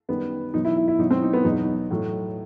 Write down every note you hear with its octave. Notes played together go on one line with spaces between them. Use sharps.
F#2 D#3 G3 B3
B2 F#3 D#4
E4
E4
E4
B2 F#3 D#4
C4
D#4
B3
E2 B2 F#3 D#4
A2 F#3